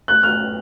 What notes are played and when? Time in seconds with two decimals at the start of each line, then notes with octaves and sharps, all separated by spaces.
0.08 F#6
0.23 F6